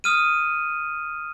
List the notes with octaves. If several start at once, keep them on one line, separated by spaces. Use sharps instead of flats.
D#6 F6 D#7